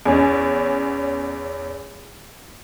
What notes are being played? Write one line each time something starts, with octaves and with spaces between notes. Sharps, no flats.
E2 C#4